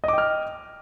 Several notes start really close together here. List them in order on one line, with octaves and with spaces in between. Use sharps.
D#5 D6 G5 F6